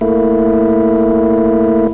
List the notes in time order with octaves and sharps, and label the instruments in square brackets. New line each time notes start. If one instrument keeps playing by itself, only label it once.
[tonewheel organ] A3 A#3 E4